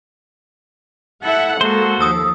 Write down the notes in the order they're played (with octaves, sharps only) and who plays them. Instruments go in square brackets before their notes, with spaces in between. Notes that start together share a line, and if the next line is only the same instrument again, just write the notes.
[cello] E4 A4 [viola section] E5 F#5
[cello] G#3 A#3 [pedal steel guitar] F#4 C5 [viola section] A4
[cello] D#2 F3 [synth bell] D#6 E6